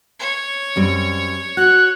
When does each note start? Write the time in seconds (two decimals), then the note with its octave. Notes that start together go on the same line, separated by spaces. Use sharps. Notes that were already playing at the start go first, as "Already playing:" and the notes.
0.20 C#5
0.76 F#2 G3 C4
1.57 F#4 F#6